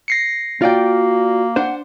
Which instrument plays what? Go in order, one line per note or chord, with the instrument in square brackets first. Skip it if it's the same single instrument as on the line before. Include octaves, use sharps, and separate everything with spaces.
[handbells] A#6 C7 C#7
[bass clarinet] A#3 [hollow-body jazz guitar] F4 D5 G5 [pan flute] F#4
[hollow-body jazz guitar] D4 C5 [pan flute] F#5